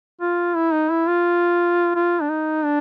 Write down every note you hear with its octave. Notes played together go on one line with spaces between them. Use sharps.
F4
E4
D#4
E4
F4
F4
D4
D#4
D4